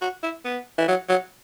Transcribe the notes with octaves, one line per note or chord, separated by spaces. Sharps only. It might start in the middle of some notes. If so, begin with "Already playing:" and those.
F#4
E4
B3
E3
F#3
F#3